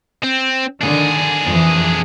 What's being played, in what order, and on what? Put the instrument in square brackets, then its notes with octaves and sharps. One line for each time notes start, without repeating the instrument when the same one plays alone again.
[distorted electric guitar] C4
[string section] D3 D#3 [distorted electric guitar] D4 G#4
[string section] F2 E3